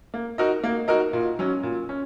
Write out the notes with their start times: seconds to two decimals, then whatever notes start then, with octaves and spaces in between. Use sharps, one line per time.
0.14 A#3
0.38 D#4 F#4 A#4 D#5
0.64 A#3
0.88 D#4 F#4 A#4 D#5
1.13 A#2
1.39 F#3 C#4
1.63 A#2
1.89 C#4